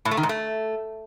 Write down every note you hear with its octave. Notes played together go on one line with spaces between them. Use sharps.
A2
A3
D#3
G#2
A3